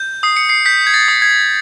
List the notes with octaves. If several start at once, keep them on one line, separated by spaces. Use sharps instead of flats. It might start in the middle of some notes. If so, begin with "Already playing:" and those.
Already playing: G6
D#6 C7
C#7
C7
G6 B6
G#6
A6
D#6
G#6